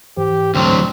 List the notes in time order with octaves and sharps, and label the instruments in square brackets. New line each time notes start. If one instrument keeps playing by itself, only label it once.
[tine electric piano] G#2 E3 C5 [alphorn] G4
[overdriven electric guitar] D2 F#3 [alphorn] C4